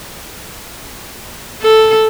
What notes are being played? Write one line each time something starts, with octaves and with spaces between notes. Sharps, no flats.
A4